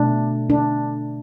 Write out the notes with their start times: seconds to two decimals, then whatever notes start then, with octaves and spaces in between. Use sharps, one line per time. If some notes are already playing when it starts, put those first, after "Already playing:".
Already playing: B2 A3 D4
0.50 D4